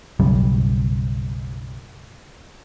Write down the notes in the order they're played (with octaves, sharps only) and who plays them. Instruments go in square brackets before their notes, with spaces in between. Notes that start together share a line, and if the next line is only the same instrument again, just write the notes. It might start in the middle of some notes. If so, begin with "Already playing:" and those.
[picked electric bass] B1 F#2 C#3 G3